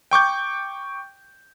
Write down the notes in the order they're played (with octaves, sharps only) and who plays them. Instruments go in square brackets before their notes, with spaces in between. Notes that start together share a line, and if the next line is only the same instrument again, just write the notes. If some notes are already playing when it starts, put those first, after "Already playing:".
[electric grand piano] G5 C#6 D6 G6